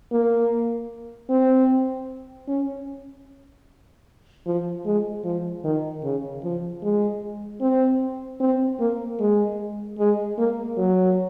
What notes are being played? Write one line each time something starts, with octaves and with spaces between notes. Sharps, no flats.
A#3
C4
C#4
F3
G#3
F3
D#3
C#3
F3
G#3
C4
C4
A#3
G#3
G#3
A#3
F#3